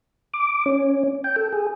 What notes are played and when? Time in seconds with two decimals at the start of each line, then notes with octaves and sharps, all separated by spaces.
0.33 D6
0.66 C#4
1.24 G5
1.36 A4
1.52 G#4